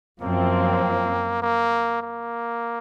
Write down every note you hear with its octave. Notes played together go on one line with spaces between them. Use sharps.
F#2 F3 A#3 C4
A#3
A#3